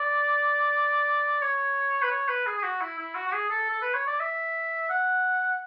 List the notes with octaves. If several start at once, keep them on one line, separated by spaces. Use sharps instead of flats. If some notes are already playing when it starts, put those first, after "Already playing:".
Already playing: D5
C#5
B4
C#5
B4
G#4
G#4
F#4
E4
E4
F#4
F#4
G#4
A4
A4
B4
C#5
D5
E5
F#5